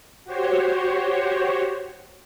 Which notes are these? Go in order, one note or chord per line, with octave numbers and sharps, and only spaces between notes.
F#4 G4 C5 C#5